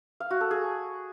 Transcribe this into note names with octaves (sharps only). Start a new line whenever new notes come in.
F5
F#4
A4
G#4